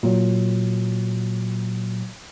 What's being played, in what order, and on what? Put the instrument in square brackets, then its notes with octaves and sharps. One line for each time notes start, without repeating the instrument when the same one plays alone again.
[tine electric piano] A#2 F#3